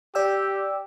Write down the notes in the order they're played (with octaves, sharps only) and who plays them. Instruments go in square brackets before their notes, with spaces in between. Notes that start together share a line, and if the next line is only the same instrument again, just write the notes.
[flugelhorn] G4 [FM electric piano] D5 G5 E6